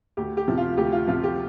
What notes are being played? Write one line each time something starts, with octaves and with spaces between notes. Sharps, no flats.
D2 G4
G4
C3 F3
F4
D2 G4
F4
C3 F3 F4
G4